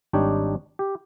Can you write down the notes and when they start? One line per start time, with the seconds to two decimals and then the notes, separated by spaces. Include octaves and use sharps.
0.13 G#1 G3 D4 D#4 C#5 G5
0.79 G4